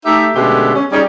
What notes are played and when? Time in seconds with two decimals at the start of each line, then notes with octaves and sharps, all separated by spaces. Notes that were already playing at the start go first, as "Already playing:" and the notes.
0.06 A3 D#4 G4 E5
0.35 B2 D3 G#3 A3 C#4 G4
0.75 C#4
0.91 G3 C#4 D#4 G4 G#4 D5